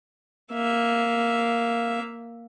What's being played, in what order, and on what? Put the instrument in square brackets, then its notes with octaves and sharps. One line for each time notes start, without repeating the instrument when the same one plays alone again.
[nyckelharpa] A#3 E5